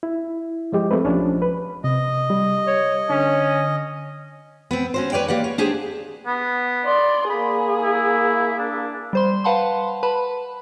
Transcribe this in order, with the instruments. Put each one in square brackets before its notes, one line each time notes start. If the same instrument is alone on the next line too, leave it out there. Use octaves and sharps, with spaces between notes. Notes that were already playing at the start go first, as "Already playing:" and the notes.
[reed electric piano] E4
[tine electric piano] F3 G#3 G4
[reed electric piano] A3 C4 B4
[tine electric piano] A#1 F3 [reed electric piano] C#4 D4
[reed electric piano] B4
[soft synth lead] C3 [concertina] D#5
[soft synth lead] G3
[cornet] C#5
[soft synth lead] D3 [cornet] C#4
[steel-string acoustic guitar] B3 C4
C#4 F#4 C5
B4 C#5 D5 G5
A#3 G4 D5 F#5
C#5
D4 G4 G#4 C5
[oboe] B3
[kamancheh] D5 C6
[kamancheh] A#3 G#4 [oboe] B5
[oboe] E4
D4
[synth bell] G3 C5 C6
B4 F5 F#5 A5 B5 C6
B4 A5 B5